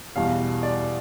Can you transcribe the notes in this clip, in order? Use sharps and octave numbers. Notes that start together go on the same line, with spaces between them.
E2 B2 G3 F5
D5